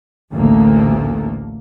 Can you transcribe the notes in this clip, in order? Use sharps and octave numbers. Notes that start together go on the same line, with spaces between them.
A1 D2 A3 A#3